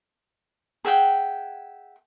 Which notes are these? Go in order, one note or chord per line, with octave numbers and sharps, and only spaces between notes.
G#4 E5 F#5 G5